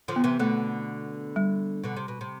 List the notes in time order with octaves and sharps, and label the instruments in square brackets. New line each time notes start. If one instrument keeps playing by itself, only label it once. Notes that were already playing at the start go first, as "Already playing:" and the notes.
[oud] D3 F3
[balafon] B3
[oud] C3 E3
[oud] B2 D3 [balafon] A3
[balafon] G3
[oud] B2 D3
C3
B2
C3